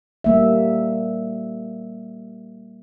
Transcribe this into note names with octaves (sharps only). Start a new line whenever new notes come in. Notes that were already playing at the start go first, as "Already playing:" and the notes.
G3 A#3 E5